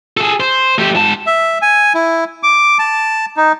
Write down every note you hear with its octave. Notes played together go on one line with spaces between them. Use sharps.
G#4 A4
C5
A3 G4
G#2 A5
E5
G#5
E4
D6
A5
D#4